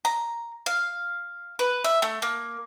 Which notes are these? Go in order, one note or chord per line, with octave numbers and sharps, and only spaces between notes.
A#5
F5
B4
E5
A3
A#3